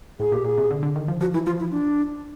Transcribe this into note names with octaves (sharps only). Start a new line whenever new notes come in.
A2 G#4
A#2 G4
A#2 G#4
C3
D3
D3
D#3
F3
F3 F#4
E3 E4
F3 F4
E4
D4